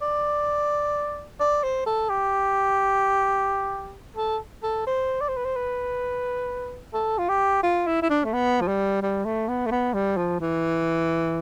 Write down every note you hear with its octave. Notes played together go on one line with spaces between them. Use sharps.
D5
D5
C5
A4
G4
A4
A4
C5
D5
C5
B4
C5
B4
A4
F4
G4
F4
E4
E4
D4
A3
B3
F3
G3
G3
A3
B3
A3
B3
G3
F3
E3